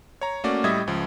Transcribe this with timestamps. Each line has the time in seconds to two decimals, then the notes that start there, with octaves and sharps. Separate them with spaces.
0.21 C#5 A#5
0.44 A3 A#3 C#4 F#4 D5
0.64 A2 G3 D#5 E5 D#6 G#6
0.87 C#2 F3